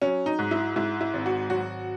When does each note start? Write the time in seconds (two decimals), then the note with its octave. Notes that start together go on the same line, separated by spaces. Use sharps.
0.02 F#3 C#4
0.26 D#4
0.39 G#2
0.51 E4
0.76 G#2 E4
1.01 E4
1.13 G#1
1.26 F#4
1.50 F#3 F#4